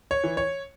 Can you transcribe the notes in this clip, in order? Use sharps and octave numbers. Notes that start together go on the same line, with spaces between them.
C#5
E3
C#5